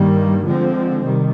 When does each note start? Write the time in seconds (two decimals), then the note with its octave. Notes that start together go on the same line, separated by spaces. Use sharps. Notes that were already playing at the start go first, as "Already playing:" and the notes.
Already playing: G2 D#3 G3 A#3
0.44 D3 F3 G#3 C4
1.03 C3 D#3 G3